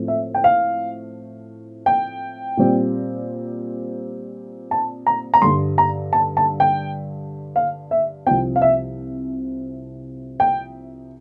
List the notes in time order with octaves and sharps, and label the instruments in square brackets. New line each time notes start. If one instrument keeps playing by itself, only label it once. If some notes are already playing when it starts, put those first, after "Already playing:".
Already playing: [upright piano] A2 F3 A3 C4
E5
G5
F5
G5
A#2 G3 C4
A5
A#5
A#5
G2 D3 G3 C6
A#5
A5
A5
G5
F5
E5
C2 C3 F3 C4 G5
F5
E5
G5